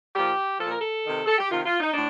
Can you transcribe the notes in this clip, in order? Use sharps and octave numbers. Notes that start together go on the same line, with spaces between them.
A#2 F3 G4
A#2 F3 A4
A#4
A4
C3 D#3
A4
G4
C3 D#3 F4
F4
D#4
A2 D4